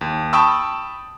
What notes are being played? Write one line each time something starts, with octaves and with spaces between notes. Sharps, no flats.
D#2
G5 A5 B5 C#6 D#6 E6